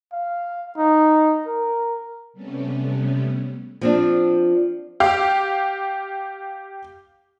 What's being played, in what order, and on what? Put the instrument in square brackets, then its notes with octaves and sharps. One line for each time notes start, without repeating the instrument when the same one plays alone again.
[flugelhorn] F5
D#4
A#4
[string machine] C3 G3 A3 B3 C#4
[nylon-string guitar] F3 C4 D4
[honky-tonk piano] G4 F5